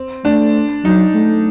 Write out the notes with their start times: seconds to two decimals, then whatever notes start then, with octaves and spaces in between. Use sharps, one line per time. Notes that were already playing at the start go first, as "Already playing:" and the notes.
Already playing: C4
0.25 A3 D4
0.84 F#3 D#4
1.15 A3